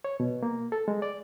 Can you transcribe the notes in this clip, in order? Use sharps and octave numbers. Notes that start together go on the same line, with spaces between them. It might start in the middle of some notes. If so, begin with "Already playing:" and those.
C#5
B2
A#3
A4
G#3
D5